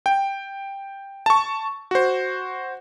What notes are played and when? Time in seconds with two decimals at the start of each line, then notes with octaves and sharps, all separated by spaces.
0.06 G5
1.26 A5 C#6
1.91 F#4 C5